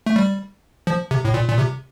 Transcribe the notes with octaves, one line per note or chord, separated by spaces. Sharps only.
A3
G3
F3
C3
A2
A#2
A#2
C3